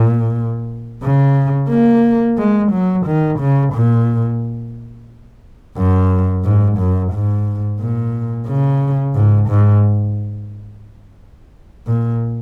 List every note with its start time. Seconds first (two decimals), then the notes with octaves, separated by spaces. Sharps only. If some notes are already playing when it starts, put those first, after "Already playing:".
Already playing: A#2
1.03 C#3
1.70 A#3
2.38 G#3
2.72 F#3
3.07 D#3
3.40 C#3
3.74 A#2
5.77 F#2
6.44 G#2
6.78 F#2
7.13 G#2
7.80 A#2
8.48 C#3
9.15 G#2
9.49 G#2
11.87 A#2